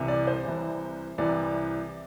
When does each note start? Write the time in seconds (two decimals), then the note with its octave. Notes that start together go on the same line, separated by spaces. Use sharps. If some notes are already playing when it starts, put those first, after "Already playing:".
Already playing: C2 C3 E3
0.08 D5
0.27 C5
0.45 C2 C3 E3
1.18 C2 C3 E3 D5